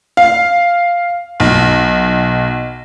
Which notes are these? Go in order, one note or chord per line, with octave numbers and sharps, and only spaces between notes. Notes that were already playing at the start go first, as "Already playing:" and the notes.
F5
B1